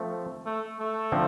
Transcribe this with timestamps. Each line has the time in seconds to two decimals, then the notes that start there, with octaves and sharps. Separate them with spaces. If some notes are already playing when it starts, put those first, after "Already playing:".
Already playing: F3 A3 C4
0.46 A3
0.79 A3
1.12 D3 F3 C4